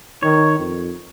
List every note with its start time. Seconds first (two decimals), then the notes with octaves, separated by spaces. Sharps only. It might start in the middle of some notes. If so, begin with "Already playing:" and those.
0.23 D#3 C#5
0.59 F2